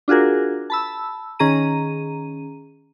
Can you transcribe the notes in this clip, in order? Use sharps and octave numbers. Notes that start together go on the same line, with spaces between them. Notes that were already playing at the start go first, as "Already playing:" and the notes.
D4 F4 F#4 G#4 A#4
A5 B5 E6
D#3 C#4 G#4 A#5 D#7